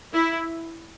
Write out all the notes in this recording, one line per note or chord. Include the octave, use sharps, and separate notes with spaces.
E4